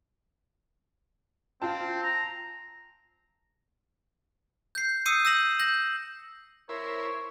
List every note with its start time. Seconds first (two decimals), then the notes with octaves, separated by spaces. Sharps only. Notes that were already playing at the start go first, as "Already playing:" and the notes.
1.62 C4 F4 G5 A5
2.03 A#5
4.75 G6 C7
5.06 D#6 E6 G6 C7 C#7 D#7
5.25 E6 G6 A#6 E7 F#7
5.59 G6 A#6 F#7
6.69 E4 A#4 C5 C#5 B5